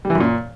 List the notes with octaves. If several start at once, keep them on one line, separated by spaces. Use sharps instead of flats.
G3
E3
F#2
A#2